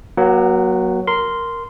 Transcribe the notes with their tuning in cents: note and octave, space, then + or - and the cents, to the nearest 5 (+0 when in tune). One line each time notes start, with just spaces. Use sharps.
F#3 +0 A#3 +40 F#5 +30
A#4 +0 C6 -10